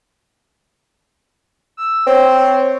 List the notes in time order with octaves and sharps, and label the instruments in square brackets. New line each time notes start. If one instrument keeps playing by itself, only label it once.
[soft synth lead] E6
[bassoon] C4 [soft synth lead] C#5